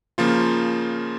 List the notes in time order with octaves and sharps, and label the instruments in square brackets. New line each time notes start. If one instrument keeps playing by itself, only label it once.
[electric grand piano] C#3 F3 A#3 F4